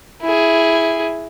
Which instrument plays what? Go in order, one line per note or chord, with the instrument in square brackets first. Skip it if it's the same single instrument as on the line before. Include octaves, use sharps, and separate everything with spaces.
[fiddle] E4 G#4